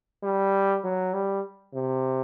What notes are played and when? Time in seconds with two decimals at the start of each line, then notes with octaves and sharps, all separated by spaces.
0.23 G3
0.84 F#3
1.14 G3
1.74 C3